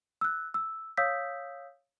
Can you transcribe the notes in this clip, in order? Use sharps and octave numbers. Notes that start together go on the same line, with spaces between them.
E6 F#6
E6
C#5 F5 D#6 E6 G6 B6